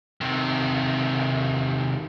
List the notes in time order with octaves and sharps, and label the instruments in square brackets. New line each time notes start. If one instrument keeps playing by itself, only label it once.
[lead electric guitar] C3 D#3